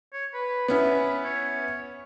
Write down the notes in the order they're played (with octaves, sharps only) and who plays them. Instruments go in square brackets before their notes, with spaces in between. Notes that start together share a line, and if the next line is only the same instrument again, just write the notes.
[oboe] C#5
B4
[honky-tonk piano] B3 C#4 E4 [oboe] B4
[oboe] C#5